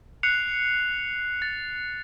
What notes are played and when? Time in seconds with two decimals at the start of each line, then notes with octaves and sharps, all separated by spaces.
0.23 F#6 C7 C#7 F7
1.42 A6